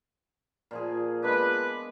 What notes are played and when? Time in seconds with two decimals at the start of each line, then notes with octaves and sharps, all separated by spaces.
0.71 A#2 F3 G#4
1.23 G#3 B3 D4 B4